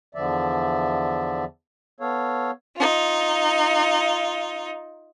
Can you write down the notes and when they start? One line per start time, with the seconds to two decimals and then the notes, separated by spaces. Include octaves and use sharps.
0.15 E2 D3 F3 D5 E5
2.00 B3 A4 C#5 F5
2.76 D#4 F4